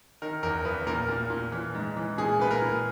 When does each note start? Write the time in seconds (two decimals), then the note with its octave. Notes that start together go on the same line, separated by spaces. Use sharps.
0.22 D#3 A#4
0.43 E2 A#4
0.65 E2 B4
0.87 A#2 A#4
1.09 A#2
1.30 A#2
1.52 E3
1.75 G#2
1.97 E3
2.18 A#2 G#4
2.40 A#2 B4
2.51 A#4
2.62 A#2